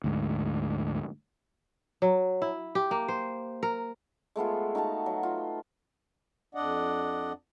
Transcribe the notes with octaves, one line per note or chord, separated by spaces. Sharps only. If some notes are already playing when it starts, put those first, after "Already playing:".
D2 G#2
F#3
E4
G4
A#3
C5
A#4
G#3 A3 B3 F4
D#4 F#4 F5 A5
F#3
F4
F2 D4 D5 D#5 F#5